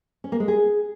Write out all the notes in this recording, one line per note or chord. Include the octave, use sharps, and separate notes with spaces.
C#4
A#3
G#3
G#4